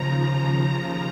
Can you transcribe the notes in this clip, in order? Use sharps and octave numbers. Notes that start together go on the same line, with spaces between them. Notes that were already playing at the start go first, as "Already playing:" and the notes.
Already playing: D#2 C#3 F3 A#5